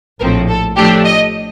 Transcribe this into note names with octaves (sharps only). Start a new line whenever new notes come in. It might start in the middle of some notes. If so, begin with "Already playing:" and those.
A#1 A2 F3 C4 A#4
A4
A2 F3 A3 D4 G4
D#5